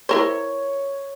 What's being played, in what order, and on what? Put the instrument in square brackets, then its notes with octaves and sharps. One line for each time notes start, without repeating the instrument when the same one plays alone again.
[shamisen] E4 A#4 C5 [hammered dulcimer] C#5